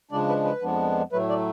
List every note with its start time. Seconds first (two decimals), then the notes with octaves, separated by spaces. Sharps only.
0.11 C#3 F3 G#3 D4 D5
0.29 B4
0.44 B4
0.62 F2 F3 G#3 B3 D4
1.12 A2 F#3 A3 B4
1.29 D5